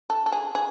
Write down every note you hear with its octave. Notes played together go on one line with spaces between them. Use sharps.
A4
A4
G#4
G#4